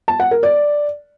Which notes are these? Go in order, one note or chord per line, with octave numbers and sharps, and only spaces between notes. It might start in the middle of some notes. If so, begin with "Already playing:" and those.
A5
F#5
A#4
D5